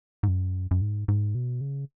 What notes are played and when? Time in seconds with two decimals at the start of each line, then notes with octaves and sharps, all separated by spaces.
0.23 G#2
0.28 F#2
0.71 F#2
0.81 G#2
1.08 G#2
1.35 B2
1.61 C#3